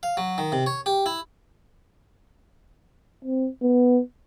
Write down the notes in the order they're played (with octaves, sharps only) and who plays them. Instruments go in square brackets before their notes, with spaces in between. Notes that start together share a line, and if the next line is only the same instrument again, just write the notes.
[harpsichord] F5
F#3
D#3
C3
C#5
G4
E4
[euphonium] C4
B3